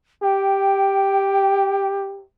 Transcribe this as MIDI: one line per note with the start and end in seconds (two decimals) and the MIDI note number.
0.23 2.24 67
0.23 1.87 79